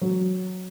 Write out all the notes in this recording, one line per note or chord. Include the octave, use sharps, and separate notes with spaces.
F#3